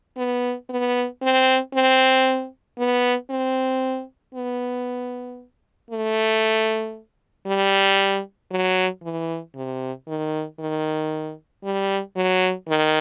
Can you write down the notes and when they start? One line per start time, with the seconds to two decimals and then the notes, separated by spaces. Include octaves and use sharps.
0.17 B3
0.69 B3
1.22 C4
1.74 C4
2.78 B3
3.30 C4
4.35 B3
5.91 A3
7.47 G3
8.51 F#3
9.03 E3
9.55 C3
10.07 D#3
10.59 D#3
11.64 G3
12.16 F#3
12.68 D#3